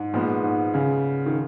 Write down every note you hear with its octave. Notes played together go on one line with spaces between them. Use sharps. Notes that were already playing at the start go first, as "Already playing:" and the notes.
Already playing: G#2
A#2 F3 G#3 B3
G#2
C#3
D#3